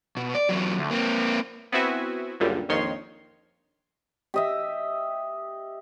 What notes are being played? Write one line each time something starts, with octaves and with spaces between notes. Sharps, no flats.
B2
D5
E2 F#3
D2
A#3 C4
B3 C4 E4 F#4 E5 G#5
C#2 F#2 A#2 D3 G3
A#1 F2 D#3 C#5 C6
G4 D#5 E5